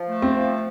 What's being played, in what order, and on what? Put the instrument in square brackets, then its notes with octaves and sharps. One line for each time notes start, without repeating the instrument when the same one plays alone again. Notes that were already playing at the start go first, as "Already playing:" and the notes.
Already playing: [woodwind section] F3
A3
[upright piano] C4
[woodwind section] F3